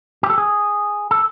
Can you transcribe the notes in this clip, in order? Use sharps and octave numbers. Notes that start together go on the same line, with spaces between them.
G4
A4
G#4
A4